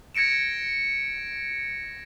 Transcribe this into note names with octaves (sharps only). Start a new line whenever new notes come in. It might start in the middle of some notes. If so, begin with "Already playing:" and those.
G#6 A#6 C#7 D7 E7